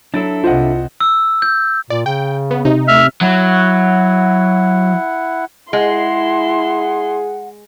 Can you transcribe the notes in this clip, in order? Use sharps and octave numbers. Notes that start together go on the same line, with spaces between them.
F#3 D4 E4 A4 A6
C2 C3 F4 C5 D#5 F#5
E6
G6
A#2 D5
C#3 G5
B3
C3 D#4
A3 E5 F6
F#3 E4 F#5
G#3 E4 G#4 F#5 C6